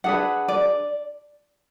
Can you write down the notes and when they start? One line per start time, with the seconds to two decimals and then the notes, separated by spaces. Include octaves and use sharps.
0.04 D4 G#4 B4 F#5
0.48 D5